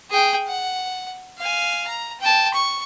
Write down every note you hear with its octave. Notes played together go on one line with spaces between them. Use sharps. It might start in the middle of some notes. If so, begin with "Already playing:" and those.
G#4 G5
F#5
F5 G#5
A#5
G5 A5
C#6